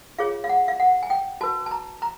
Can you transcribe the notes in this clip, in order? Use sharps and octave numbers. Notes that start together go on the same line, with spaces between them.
F4 G#4 C#5 F5
F5
F#5
F5
F#5
G#5
G5
F#4 B4 A5
A5
A#5
A#5